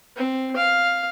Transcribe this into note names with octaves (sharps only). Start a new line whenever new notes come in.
C4
F5